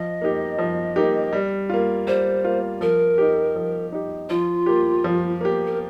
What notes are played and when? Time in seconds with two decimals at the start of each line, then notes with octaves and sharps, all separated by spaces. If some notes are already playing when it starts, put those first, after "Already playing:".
Already playing: F3 D#5
0.21 A#3 D#4 G4
0.58 F3
0.96 A#3 D#4 G4
1.33 G3
1.70 A#3 F4
2.07 G3 C5
2.44 A#3 F4
2.81 F3 A#4
3.18 D#4 G4
3.55 F3
3.92 D#4 G4
4.29 F3 F4
4.66 A#3 G4
5.04 F3
5.41 A#3 G4
5.67 A#4